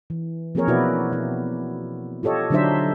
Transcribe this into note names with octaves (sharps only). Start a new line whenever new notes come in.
E3
F3 A#3 C4 G#4 A#4 C#5
B2 E4 F#4 B4 D5
E4
F4 G4 A4 C#5 D#5
D3 F#3 D4 D#4 C5 E5